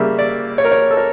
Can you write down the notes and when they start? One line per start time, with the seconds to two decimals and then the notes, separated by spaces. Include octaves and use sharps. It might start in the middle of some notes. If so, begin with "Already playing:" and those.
Already playing: C#3 G3 A#3 E5
0.19 D5
0.58 C#5
0.65 A#4
0.71 C#5
0.91 A4
0.97 A#4